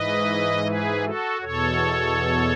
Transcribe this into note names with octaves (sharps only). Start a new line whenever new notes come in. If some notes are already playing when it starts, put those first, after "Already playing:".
Already playing: G#2 E3 B4 D#5
G#4 B4
F#4 A4
E2 B2 A4 C#5